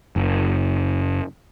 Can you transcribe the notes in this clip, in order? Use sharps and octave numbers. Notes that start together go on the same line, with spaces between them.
F#1